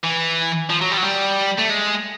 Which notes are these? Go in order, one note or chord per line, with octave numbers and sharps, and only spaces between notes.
E3
F3
F#3
G3
F#3
G3
A3
G#3